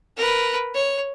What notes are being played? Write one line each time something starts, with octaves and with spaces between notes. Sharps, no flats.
A#4 B4
C#5